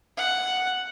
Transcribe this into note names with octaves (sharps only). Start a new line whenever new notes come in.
F#5